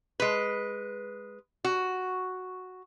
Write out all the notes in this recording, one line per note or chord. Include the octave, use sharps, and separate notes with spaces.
G#3 B4
F#4